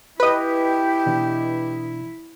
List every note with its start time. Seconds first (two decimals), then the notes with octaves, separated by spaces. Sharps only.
0.20 E4 G4 B4 D#5
1.06 B2 E3 D4